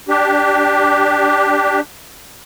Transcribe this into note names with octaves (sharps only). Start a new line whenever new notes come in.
D4 G4